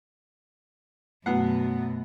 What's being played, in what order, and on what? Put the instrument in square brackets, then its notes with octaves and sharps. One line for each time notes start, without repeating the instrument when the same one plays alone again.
[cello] F#2 B2 [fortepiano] F#3 B3 F#5 [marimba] A3